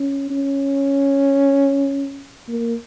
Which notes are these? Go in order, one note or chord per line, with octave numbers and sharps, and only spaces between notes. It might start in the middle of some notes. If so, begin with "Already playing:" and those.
Already playing: C#4
C#4
A#3